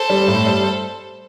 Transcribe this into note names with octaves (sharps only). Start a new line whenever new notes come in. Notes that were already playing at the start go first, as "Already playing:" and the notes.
Already playing: A4 C5
G3
A2
G3